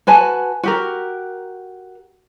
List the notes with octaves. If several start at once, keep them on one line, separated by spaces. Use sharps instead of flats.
F#4 B4 G#5 A5
F#4 G4 A#4